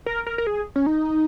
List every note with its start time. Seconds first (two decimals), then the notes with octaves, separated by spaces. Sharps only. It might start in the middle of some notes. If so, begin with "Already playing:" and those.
0.06 A#4
0.27 A#4
0.38 A#4
0.47 G#4
0.76 C#4
0.86 D#4